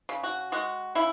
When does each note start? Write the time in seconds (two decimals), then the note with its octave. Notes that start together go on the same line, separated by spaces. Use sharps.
0.09 C#3
0.24 F#4
0.52 G#3 F#4
0.95 C#3 E4